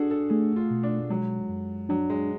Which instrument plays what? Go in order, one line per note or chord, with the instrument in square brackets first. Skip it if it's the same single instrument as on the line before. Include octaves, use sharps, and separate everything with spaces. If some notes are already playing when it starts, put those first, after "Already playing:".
Already playing: [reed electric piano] D4 [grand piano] F#4 G#4 A4
[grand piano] A4
[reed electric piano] A3 [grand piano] G#4
[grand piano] F4
[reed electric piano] B2
[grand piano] D4
[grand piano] F#3 [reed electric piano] G#3
[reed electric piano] F#2
[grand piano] F#3 [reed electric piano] D4
[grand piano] G#3